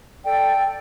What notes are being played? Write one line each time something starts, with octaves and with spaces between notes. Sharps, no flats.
A4 D5 G5